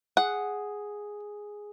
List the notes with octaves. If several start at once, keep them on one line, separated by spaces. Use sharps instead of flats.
G#4 F#5